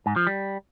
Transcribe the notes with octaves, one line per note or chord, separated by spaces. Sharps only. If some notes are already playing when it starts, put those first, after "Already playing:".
G#2
F3
G3